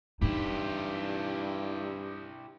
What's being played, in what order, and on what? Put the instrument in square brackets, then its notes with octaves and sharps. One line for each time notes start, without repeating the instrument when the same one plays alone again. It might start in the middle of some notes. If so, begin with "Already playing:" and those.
[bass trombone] G2 [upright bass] E3 D#4 [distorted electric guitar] E4 G4